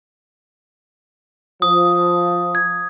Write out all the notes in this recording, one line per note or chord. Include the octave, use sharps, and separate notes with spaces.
F3 D#6
G#6